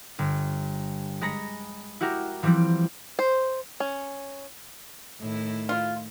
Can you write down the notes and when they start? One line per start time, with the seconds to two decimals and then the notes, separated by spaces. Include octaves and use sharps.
0.19 G1
1.21 G#3 A#5 B5 A#6 C#7
2.01 E4 F#4 G4 A#4
2.43 E3 F3 G3 C4 E4
3.19 C5
3.80 C#4
5.20 A2 D#3 E4
5.69 F4